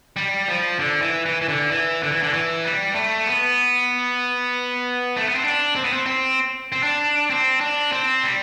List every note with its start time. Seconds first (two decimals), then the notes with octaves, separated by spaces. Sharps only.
0.16 G3
0.48 F3
0.79 D3
1.02 E3
1.26 E3
1.42 E3
1.48 D3
1.71 E3
2.03 D3
2.12 E3
2.23 D3
2.33 E3
2.65 G3
2.95 A3
3.27 B3
5.17 A3
5.27 B3
5.35 C4
5.44 D4
5.75 C4
5.84 B3
5.93 C4
6.06 C4
6.72 C4
6.83 D4
7.30 C4
7.61 D4
7.92 C4
8.24 G3